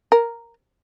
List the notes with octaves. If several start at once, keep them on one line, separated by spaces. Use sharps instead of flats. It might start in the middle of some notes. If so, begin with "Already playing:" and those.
A#4